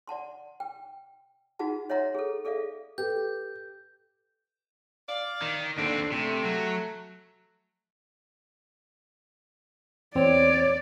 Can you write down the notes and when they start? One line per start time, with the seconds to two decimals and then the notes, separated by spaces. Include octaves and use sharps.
0.07 D5 F#5 A5 C6
0.60 G5
1.59 D#4 F4 F#4 G#4 F#5 A5
1.90 C#5 D#5 E5 F#5 A#5 C6
2.15 G#4 A4
2.45 G#4 A4 D5 E5 F5
2.98 G4 A4 B4 G6
5.08 D5 F5
5.42 D#3
5.78 D#2 D3 F3 C4 D4
6.12 C3 A3
6.44 F#3
10.15 E2 C4 C#5 D5